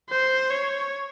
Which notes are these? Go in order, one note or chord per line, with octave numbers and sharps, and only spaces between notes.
C5
C#5